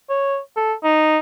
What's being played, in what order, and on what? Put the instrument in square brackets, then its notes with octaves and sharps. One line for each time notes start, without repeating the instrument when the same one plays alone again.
[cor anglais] C#5
A4
D#4